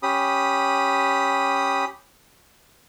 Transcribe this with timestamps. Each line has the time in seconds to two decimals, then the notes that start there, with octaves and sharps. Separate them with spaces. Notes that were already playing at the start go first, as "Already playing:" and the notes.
0.03 C#4 G4 B5 D#6